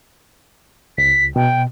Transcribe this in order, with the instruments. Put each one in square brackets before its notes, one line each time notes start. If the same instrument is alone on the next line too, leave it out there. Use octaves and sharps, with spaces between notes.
[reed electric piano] C#2 [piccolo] B6
[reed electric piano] B2 [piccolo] G5